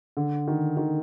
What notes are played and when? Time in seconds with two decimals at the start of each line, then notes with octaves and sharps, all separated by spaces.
0.17 D3
0.48 D#3
0.77 D#3